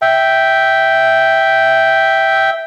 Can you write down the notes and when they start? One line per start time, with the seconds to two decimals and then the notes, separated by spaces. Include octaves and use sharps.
0.02 E5 G5